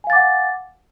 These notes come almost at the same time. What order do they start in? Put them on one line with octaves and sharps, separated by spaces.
G#5 F5 A6 D6 F#5